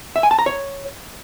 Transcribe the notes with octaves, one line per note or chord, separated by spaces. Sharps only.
E5
G#5
A5
A#5
C#5